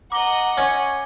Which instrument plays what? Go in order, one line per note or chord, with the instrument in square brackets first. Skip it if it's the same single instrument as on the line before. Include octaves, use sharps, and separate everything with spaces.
[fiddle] D#5 F#5 [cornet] A#5 [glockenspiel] D6 G7
[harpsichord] C#4 [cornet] C#5